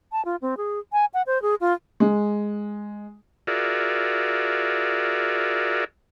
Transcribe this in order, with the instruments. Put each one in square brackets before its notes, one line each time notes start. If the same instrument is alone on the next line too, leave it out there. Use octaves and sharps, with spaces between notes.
[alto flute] A5
F4
C4
G#4
G#5
F#5
C5
G#4
F4
[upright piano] G#3
[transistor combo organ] F4 F#4 G#4 A#4 D5 E5